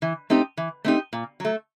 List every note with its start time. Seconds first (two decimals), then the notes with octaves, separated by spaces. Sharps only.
0.02 E3
0.30 A3 C4 D#4 G4
0.57 E3
0.85 A3 C4 D#4 G4
1.13 A#2
1.40 F#3 A3